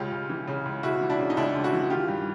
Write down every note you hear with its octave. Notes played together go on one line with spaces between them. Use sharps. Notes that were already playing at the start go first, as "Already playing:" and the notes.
Already playing: C#2 C#3 F4 G4
C#2
E3
C#3
C#2
C#2 E4 F#4
E3
D4 E4
C#3
D#4
C#2 D4 E4
C#2
E4 F#4
E3
D#3 F4 G4
G2